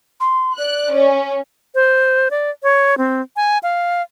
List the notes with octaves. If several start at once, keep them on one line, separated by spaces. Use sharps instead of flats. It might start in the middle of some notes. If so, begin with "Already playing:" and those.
C6
D5 F#6
C#4
C5
D5
C#5
C4
G#5
F5